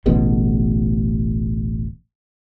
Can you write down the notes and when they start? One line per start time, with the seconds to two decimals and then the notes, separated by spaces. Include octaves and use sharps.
0.06 D1 A1 B2 D3